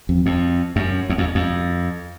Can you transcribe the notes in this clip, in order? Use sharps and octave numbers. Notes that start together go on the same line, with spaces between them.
F2
F2
F#2
E2
F2
F2